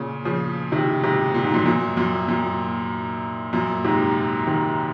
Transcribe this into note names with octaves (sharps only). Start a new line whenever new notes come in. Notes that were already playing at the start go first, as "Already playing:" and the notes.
Already playing: A#2 C#3
C#3 F3
C3 D#3
G#2 C3
A#2
G#2
F#2 A#2
F#2 A#2
F#2 A#2
F#2 A#2
F#2 A#2
G#2 C3
C3 D#3